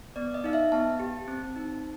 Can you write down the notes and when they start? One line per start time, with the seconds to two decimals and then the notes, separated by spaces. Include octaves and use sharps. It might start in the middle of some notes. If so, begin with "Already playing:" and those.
0.16 B3 D5
0.34 D#5
0.44 D#4 F5
0.53 E5
0.72 B3 A5
1.00 G4
1.28 C4
1.56 D#4